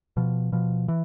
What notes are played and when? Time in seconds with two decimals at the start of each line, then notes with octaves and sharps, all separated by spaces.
0.17 B2 F3
0.52 B2 F3
0.88 E3